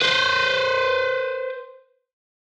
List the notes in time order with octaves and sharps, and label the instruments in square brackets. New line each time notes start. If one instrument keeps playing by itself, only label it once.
[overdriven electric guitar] B4 C5